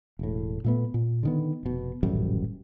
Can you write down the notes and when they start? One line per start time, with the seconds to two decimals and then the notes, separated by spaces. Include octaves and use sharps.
0.19 E1 A2
0.64 A#2 A3 B3
0.94 A#2
1.23 D3 D#3 B3
1.63 F1 B2
2.03 D#1 A1 F#2 G3